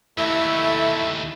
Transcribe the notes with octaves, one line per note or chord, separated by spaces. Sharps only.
D#2 E3 A3 E4